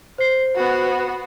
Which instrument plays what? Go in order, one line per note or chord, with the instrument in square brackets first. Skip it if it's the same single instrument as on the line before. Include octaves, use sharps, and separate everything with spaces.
[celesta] C5 C7
[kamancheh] B3 F#4